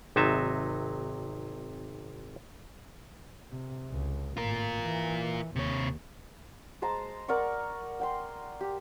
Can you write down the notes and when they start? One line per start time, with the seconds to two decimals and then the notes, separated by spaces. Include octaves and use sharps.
0.16 G#1 C3 F#3 D#4 E5 A5
3.51 C3
3.93 C#2
4.37 G#1 A2 F4 A#4
4.82 E3
5.56 D#2 C3 C#5
6.82 G#3 C5 A5 A#5
7.28 A#4 D5 F#5 C#6
8.00 F#5 G5 C6
8.61 G4